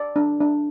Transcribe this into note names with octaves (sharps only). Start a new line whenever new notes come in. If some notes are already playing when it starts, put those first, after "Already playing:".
Already playing: D5
D4
D4